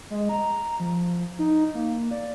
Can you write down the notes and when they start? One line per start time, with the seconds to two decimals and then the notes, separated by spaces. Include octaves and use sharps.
0.10 G#3
0.29 A#5
0.80 F3
1.39 D#4
1.74 A#3
2.11 D5